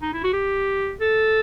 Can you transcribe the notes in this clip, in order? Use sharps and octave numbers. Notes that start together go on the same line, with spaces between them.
D#4
E4
F#4
G4
A4